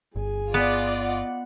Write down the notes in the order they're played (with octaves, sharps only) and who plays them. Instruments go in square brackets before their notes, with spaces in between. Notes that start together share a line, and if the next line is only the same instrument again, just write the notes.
[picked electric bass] G1 [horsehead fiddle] G#4 G#5
[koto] B3 [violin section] F4 D5 D#5
[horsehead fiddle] F#5